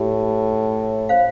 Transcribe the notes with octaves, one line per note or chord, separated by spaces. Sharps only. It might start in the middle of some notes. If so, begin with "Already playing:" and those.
Already playing: A2 G4
C5 F5